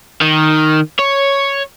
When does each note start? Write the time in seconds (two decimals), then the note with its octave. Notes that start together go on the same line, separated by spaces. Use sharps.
0.21 D#3
0.99 C#5